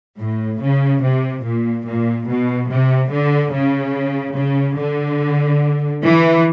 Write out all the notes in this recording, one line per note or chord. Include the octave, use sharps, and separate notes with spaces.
A2
C#3
C3
A#2
A#2
B2
C3
D3
C#3
C#3
D3
E3